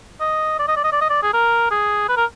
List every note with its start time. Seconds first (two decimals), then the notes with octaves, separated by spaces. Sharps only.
0.21 D#5
0.59 D5
0.68 D#5
0.76 D5
0.84 D#5
0.92 D5
1.01 D#5
1.10 D5
1.23 G#4
1.34 A#4
1.71 G#4
2.09 B4
2.17 A#4